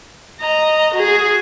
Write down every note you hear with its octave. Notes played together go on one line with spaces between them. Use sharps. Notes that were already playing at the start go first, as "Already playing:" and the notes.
D#5 A#5
F#4 G#4